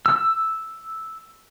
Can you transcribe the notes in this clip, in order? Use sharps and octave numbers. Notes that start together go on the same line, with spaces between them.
E6